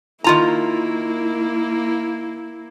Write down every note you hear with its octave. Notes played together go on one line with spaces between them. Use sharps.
D#3 A#3 E4 F4 A#5